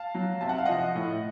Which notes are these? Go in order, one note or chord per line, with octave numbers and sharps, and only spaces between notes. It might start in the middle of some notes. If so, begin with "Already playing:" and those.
Already playing: F5 A5
F#3
C3 A5
F#5
F5
F3 D#5 F#5
A2